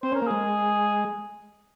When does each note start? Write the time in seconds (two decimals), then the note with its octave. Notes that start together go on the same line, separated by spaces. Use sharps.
0.03 C4 C5
0.12 C#4 A#4
0.22 A#3
0.27 G#3 G#4